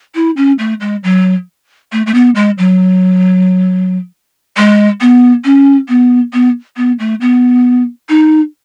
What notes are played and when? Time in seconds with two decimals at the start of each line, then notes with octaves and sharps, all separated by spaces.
0.15 E4
0.37 C#4
0.59 A3
0.81 G#3
1.04 F#3
1.92 A3
2.06 A3
2.14 B3
2.35 G#3
2.58 F#3
4.57 G#3
5.01 B3
5.45 C#4
5.89 B3
6.33 B3
6.77 B3
6.99 A3
7.21 B3
8.09 D#4